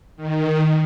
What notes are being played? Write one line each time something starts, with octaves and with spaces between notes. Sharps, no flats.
D#3